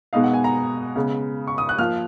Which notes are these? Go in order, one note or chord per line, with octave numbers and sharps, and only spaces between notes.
B2 G#3 B3 D#4 F5
F#5
G#5
A#5
C#3 G#3 B3
C#6
D#6
F#6
F3 A#3 F4 F6